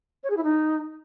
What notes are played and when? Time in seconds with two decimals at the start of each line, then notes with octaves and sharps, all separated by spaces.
0.23 C#5
0.30 G#4
0.37 E4
0.43 D#4